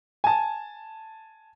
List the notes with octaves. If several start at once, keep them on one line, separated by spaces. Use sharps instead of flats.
G#5 A5